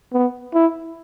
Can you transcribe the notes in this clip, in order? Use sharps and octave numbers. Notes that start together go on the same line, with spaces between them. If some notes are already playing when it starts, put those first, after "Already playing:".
B3
E4